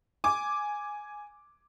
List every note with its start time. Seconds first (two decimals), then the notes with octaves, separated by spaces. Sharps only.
0.24 G#5 D6